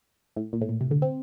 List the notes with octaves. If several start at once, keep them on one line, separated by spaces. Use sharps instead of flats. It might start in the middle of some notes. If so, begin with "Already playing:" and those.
A2
A#2
A2
A#2
C3
D3
C4